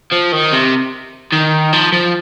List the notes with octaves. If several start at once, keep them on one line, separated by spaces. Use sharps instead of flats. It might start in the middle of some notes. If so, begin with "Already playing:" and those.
F3
D#3
C3
D#3
F3
F3